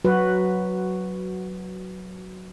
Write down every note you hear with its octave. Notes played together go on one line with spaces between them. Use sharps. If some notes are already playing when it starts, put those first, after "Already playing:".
F#3 F#4 B4